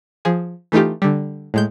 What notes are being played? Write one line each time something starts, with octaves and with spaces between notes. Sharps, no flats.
F3 G#4
E3 A3 D#4 F4 G4
D3 G3
A2 G#3 G6